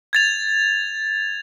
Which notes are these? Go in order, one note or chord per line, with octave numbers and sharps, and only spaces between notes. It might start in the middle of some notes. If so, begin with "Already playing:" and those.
G#6 A6 F7